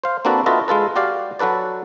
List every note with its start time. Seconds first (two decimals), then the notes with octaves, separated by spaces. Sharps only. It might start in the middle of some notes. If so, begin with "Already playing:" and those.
0.04 C5 F5
0.25 A#3 C4 D4 F#4 A4 B4
0.46 F4 F#4 A4 B4 D#5 E5
0.68 G#3 F4 A4 B4
0.96 F#4 G4 D5 F5
1.39 F#3 F#4 A4 B4 D5